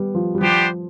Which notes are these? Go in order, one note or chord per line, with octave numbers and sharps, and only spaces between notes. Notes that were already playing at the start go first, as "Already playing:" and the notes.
Already playing: G3 B3
F3
G3
F3 B3 D4 G4 C5